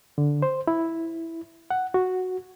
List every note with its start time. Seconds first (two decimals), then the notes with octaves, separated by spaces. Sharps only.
0.18 D3
0.42 C5
0.67 E4
1.70 F#5
1.94 F#4